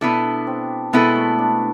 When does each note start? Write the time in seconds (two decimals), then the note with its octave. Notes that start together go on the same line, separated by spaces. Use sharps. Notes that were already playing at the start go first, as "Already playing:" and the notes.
0.01 B2 B3 D4 E4 A4
0.47 C4
0.93 B2 G#3 B3 E4 A4
1.15 A3
1.39 D4